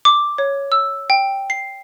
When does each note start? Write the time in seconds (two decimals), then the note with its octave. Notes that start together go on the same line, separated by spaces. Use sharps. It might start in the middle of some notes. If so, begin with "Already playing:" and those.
0.05 D6
0.38 C#5
0.72 E6
1.10 G5
1.50 C7